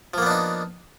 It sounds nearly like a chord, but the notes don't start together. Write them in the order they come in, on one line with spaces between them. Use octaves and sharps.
F3 A#3 B3 D4 D#4